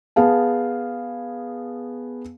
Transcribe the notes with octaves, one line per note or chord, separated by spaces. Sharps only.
B3 G#4 F5 A5